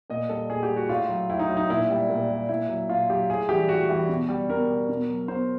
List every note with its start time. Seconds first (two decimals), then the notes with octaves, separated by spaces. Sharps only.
0.10 A#2 D#5
0.29 G3 A4
0.50 A#2 G#4
0.63 G4
0.70 G3
0.77 F#4
0.89 A2 F4
1.09 F#3
1.30 A2 E4
1.39 D#4
1.49 F#3
1.57 D#4
1.70 A#2 E4
1.90 G3
2.09 A#2
2.29 G3
2.49 A#2 E4
2.69 F#3
2.89 A#2 F4
3.10 F#3 G4
3.29 A2 G#4
3.49 E3 G3 G4
3.69 A2 F#4
3.89 E3 G3
4.09 B2
4.29 G3
4.49 B2 A#4
4.69 G3
4.89 B2
5.09 F#3
5.28 B2 C5